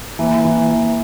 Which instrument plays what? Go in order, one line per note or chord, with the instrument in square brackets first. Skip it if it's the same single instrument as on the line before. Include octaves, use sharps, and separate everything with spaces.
[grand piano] E3 [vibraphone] A#3
[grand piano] E3
E3